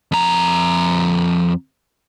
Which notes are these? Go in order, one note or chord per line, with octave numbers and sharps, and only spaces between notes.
F2 A#5